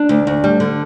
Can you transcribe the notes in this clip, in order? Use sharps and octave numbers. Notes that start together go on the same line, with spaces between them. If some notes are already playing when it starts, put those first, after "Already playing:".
Already playing: D4
D2
D2
G3
D3